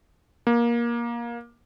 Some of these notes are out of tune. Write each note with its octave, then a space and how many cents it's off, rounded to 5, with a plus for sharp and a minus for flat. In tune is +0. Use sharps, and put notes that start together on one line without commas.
A#3 +20